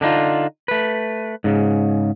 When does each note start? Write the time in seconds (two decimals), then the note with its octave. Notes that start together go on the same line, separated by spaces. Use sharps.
0.01 D3 D4 D#4 F4
0.68 A3 B4
1.44 G#2 C#3